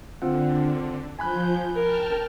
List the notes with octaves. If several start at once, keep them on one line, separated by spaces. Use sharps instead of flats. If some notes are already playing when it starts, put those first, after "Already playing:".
D3 C4 F4 F#5
F3 G#5 B5 F#6 G6
A#4 G5 A5 F6